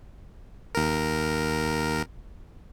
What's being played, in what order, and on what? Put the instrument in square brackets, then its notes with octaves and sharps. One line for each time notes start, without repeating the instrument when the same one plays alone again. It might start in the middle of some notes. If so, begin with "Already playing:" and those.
[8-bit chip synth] D#2 A#4